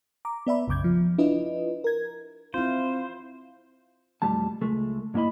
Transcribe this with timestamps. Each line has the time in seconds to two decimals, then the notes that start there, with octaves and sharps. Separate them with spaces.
0.25 A#5 D6
0.47 B3 D5 E5 B5
0.68 B1 F#2 C#3 D6 G6 G#6
0.84 F3
1.18 D4 E4 F4 B4 D#5
1.84 A#4 G#6
2.54 C4 E4 F4 C5 F5
4.22 B1 F2 G3 A3 A5
4.62 C#2 G#3 A3
5.14 G2 A#3 E4 D#5 B5